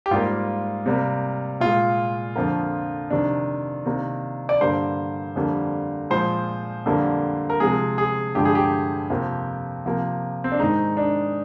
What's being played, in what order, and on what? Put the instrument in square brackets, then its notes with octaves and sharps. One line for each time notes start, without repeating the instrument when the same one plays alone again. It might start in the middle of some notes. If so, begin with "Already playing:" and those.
[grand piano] G4
G#2 G3 A#3 F4
C3 G3 A#3
A#2 G#3 F4
F2 D3 F3 A#3
F2 C3 D#3 D4
C3 D#3 A#3
D5
G2 D3 G3 A#3 C5
F2 D3 G3 A#3
A#2 F3 G#3 C5
F2 D3 G3 A#3
A#4
C3 F3 G#3 G#4
G#4
G2 D3 F3 G#3 G4
G#4
G4
F2 C3 F3 A#3
C3 F3 A#3
C4
D4
G#2 D#3 G#3 D#4
D4